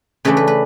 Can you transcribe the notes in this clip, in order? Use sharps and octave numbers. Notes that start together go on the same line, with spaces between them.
C#3 E3 A3 D4 B4
B4
B4